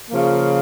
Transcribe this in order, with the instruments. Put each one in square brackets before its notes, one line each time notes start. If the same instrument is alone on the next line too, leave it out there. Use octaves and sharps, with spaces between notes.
[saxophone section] C#3 F3 A#3